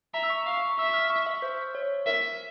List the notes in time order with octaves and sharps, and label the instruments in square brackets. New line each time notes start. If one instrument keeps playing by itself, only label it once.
[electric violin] E5 [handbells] A#5
[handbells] E6
C#6
[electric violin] F5 [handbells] C#6
[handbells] C#6
[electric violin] E5 [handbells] E6
[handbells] F6
C#6
E5
C5
C#5
[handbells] A#4 [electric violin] E5